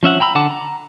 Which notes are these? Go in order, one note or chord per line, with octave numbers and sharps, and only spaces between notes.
F3 C#4 E5 F#5
G5 A#5 B5 E6
D3 F#5 A5 D6
A#5